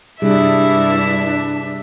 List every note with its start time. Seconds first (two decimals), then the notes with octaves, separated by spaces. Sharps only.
0.22 G2 C3 G3 D4 E4 G#4 E5